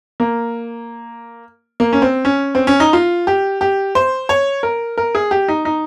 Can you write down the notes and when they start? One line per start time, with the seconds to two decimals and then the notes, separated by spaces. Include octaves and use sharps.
0.20 A#3
1.80 A#3
1.93 C#4
2.02 C4
2.25 C#4
2.55 C4
2.67 C#4
2.80 D#4
2.93 F4
3.27 G4
3.61 G4
3.95 C5
4.29 C#5
4.63 A#4
4.98 A#4
5.15 G#4
5.31 G4
5.48 D#4
5.65 D#4